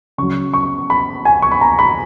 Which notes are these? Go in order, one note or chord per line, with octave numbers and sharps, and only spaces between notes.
C#3 F#3 C#6
C#6
B5
G#5
C#6
B5
A#5
B5